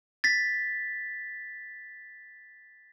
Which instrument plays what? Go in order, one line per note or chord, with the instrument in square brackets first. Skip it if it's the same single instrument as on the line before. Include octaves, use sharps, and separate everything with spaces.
[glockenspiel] A6 B6